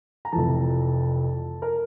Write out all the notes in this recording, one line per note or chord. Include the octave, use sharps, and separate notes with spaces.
A#5
F1 F2 E3 A5
A#4